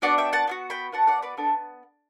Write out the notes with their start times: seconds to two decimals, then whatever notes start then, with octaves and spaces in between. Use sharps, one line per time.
0.02 B3 D4 F#4 D5 F#5
0.18 E5 G5
0.33 F#5 A5
0.47 B3 D4 F#4
0.70 G5 B5
0.92 B3 D4 F#4 F#5 A5
1.07 D5 F#5
1.22 B4 D5
1.37 B3 D4 A4